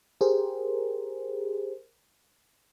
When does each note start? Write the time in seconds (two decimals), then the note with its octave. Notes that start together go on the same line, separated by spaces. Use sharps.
0.21 G4 G#4 A#4 C5